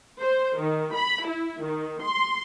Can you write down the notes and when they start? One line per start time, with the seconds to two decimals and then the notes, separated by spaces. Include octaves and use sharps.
0.22 C5
0.58 D#3
0.95 B5
1.26 E4
1.62 D#3
2.03 C6